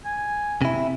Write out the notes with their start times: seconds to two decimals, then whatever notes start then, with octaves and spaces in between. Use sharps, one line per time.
0.05 G#5
0.62 C3 E4